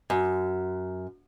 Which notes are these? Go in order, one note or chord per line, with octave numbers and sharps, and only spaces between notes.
F#2